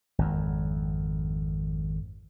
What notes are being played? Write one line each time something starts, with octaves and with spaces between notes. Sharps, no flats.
G#1 F2